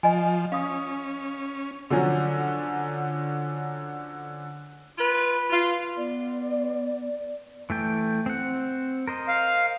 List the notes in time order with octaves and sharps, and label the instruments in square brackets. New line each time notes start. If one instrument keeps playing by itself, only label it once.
[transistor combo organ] F3 [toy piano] D#5 G#5
[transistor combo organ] C#4 [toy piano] F5 D#6
[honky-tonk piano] D3 F3 F#3 C#4
[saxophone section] F4 B4
F4
[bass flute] B3 [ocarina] D5
[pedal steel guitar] E3 A3 G5
C4 F#5
A#4 C5 D#5
[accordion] F5